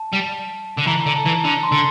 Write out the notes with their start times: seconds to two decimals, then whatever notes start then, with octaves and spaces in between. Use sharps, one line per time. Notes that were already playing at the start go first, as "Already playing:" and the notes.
Already playing: A5
0.13 G3
0.78 D3
0.87 E3 A#5
1.06 D3
1.16 A5
1.26 E3
1.44 D3
1.63 C6
1.72 D3